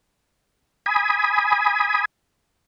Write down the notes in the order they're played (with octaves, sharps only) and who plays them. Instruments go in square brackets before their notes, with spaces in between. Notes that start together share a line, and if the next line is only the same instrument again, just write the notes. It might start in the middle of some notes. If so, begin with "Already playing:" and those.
[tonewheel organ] G#5 B5 D#6